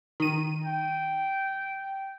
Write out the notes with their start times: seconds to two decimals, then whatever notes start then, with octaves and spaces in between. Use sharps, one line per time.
0.20 D#3 D#7
0.65 G5